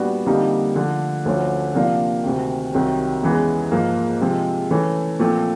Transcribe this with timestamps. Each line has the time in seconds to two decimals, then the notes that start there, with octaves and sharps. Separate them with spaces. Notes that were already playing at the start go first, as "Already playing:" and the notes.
Already playing: A#2 G3 B3 D4 F#4
0.26 F2 D3 G3 A#3 D#4
0.76 D3 F3 A3
1.25 D2 D3 F3 A3 C#4
1.75 C3 F3 A#3 D4 F4
2.23 D2 C3 D#3
2.73 C2 C3 D#3 F#3
3.23 E2 C#3 E3 G#3 B3
3.72 G#2 F3 A#3
4.21 C3 F3 G#3 C4
4.71 C#3 E3 A3 C#4
5.19 A#2 F3 A3 C4